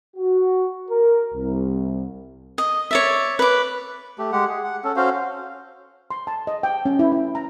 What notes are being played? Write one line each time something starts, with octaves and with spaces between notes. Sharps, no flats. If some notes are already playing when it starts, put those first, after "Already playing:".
F#4
A#4
C2
D#5
C#5 D5 E5
B4 D6
A3 G4
G#3 G4 F#5
G#4
F#5
C#4 A4
C#4 F#4 C5 F5
C6
A5
D#5
G5
C#4
E4
E4
A#5